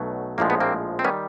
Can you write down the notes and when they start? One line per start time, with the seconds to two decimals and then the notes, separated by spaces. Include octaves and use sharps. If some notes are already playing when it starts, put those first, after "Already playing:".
Already playing: B1 B2 F#3 A3
0.38 A#1 A2 F3 G#3 A#3
0.50 B3
0.60 A#3 C4
0.99 C4
1.04 D#3 G3 B3 C#4